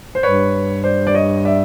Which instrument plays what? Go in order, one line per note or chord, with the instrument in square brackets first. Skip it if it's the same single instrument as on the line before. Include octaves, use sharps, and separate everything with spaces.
[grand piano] C5
[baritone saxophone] G2 [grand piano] B4 C#5
[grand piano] C5 D5
D5
C#5 D#5
D5 E5